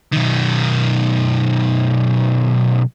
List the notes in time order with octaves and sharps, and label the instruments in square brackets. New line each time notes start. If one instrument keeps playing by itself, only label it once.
[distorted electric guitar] B1 D#3